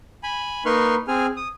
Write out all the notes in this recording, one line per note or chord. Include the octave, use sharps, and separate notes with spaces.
G#5 B5
A#3 D#4 B4 C6 C#6 F6
C4 G#4 G#5 F6
D#6